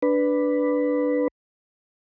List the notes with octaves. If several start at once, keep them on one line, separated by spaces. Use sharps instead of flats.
D4 B4